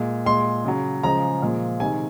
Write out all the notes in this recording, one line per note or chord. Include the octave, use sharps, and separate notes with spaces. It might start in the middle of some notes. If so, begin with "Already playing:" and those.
Already playing: A#2 G#3
A#2 G#3 C6
C#3 F#3
C#3 F3 G#3 A#5
A#2 F3 G#3
C3 D#3 G#3 G#5